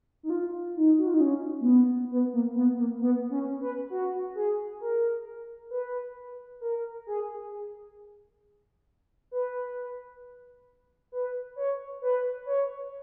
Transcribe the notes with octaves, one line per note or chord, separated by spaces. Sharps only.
D#4
F4
D#4
F#4
F4
D#4
C#4
A#3
B3
B3
A#3
B3
A#3
B3
C#4
B4
F#4
G#4
A#4
B4
A#4
G#4
B4
B4
C#5
B4
C#5